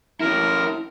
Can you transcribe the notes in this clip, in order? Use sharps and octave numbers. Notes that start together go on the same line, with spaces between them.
C#4 E4 A#4